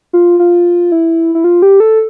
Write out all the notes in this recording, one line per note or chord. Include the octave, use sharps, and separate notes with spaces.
F4
F4
E4
E4
F4
G4
A4